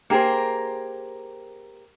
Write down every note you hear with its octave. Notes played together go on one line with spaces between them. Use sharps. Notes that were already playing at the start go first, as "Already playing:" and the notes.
A#3 G4 G#4 A#4 C5